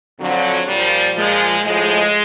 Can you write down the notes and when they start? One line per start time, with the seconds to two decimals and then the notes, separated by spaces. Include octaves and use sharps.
0.19 F2 D3 F3 F#3
0.67 A#2 F3 G3
1.16 A#2 F3 G#3
1.64 A2 F3 G#3